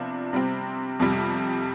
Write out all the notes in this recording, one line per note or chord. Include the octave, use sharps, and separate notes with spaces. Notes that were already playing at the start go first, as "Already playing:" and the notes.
Already playing: C3 F3 B3 D4 F4
C3 G3 C4
F2 C3 G3